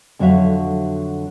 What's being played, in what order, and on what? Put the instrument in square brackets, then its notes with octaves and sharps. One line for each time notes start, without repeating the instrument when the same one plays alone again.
[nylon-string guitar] F2 D3 F#3 F#4 E5 F5